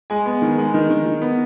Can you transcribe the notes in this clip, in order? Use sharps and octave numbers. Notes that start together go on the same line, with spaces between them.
G#3 G#5
B3
D#3
G#3
D#3
D#3
D#3
B3